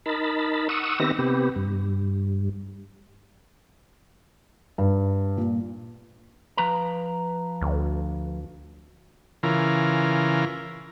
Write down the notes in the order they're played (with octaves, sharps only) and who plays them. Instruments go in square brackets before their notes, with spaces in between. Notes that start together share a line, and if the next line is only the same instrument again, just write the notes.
[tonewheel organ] D#4 A#4 A5 B5
F#5 C#6 D#6 E6
D#3 B3 C4 G4 E5 A#6
C3 B3 G4
G2
[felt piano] G2
A#2
[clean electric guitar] F3 B4 A#5
[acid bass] D2
[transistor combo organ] C#3 E3 F4 A#4